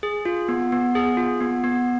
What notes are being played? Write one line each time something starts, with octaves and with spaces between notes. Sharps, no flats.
G#4
F4
B3
B3
G#4
F4
B3
B3